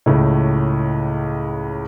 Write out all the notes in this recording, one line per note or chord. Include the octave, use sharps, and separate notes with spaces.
C#2 A2